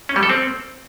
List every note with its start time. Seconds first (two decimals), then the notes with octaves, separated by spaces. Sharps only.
0.09 C#4
0.16 G3
0.23 A4
0.30 C4